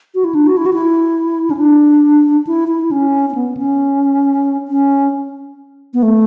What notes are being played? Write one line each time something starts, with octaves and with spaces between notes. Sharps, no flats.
F#4
E4
D4
F#4
E4
F#4
E4
C#4
D4
E4
E4
C#4
C#4
B3
C#4
C#4
B3
A3